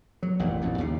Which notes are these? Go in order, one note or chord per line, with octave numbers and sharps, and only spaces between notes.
F#3
A1 F#2 A#2
A1 F2 A#2
D#2 C#3